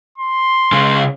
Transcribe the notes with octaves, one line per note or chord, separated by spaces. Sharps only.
C6
C#3 G#3